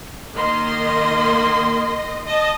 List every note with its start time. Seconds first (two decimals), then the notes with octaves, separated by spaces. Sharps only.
0.35 D#3 A#3 D#5 C6
2.25 D#5 A5